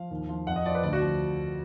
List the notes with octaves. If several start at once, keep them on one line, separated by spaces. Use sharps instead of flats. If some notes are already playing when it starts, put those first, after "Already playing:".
Already playing: F3 F5
D#2
F3
F2 F#5
D#5
F3 D5
B4
D2 D5
F#4
F3